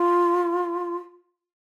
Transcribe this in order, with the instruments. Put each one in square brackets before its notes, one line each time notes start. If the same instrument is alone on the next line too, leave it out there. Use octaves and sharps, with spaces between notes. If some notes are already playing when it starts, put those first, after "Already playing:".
Already playing: [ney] F4